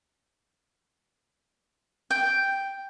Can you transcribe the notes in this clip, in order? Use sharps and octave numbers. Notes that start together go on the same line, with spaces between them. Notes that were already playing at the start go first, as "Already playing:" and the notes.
G5